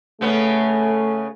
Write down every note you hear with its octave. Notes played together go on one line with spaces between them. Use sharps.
C#3 A3 B3 C#4